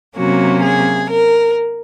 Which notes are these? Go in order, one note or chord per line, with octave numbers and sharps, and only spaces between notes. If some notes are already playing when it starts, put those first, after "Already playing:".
C3 F#3 A#3 C#4 F#4
G#4
A#4